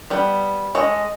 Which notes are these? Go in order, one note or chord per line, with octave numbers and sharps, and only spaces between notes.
G3 B3
G#3 A4 C#5 D#5